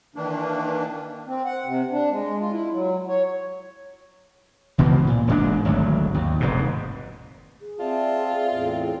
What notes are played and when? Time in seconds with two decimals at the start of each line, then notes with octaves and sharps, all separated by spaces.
0.16 D#3 E3 A#3 D4
1.27 C4
1.45 F#5
1.66 C3
1.91 D4
2.10 G#3
2.40 F4
2.51 E4
2.72 F#3
3.07 C#5
4.78 C#2 B2 E3 F3
5.07 A#2
5.27 E1 G#2 D4
5.65 G#1 D2 F#3
6.14 D#2
6.40 F1 G#2 B2
7.61 G#4
7.79 C4 F4 D5 E5 F5 A5
8.50 E2 A2 C4